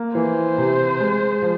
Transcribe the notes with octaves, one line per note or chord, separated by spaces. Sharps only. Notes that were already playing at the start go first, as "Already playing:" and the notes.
Already playing: A#3
E3 C5
C3
G#3
F3